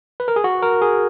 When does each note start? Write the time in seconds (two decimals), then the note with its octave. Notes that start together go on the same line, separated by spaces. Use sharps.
0.20 B4
0.28 A#4
0.36 G#4
0.44 F#4
0.62 A#4
0.82 G#4